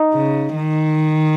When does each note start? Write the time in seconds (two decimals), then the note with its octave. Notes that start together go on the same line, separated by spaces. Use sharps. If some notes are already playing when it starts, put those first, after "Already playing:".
Already playing: D#4
0.14 C#3
0.56 D#3